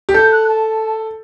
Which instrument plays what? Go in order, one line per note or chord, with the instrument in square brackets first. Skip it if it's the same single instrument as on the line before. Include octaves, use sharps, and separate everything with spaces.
[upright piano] G4
[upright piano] A4 [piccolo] G6
[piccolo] F#6
A5